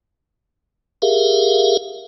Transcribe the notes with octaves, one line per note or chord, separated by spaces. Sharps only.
G4 G#4 A#4 E5 F5